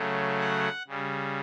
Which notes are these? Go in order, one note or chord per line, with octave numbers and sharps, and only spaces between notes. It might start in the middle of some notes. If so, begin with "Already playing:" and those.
Already playing: C#3 F#3 A3
F#5
C#3 G3